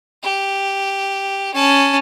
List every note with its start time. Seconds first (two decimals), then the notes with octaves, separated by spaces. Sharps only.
0.23 G4
1.54 C#4 A5